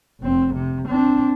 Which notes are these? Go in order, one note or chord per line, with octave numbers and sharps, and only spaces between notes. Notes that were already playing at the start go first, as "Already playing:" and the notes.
F1 C4
C3
C4 D4